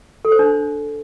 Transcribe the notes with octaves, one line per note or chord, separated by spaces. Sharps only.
A4
C5
D4